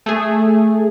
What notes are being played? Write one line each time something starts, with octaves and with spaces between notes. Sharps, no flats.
A3 G#4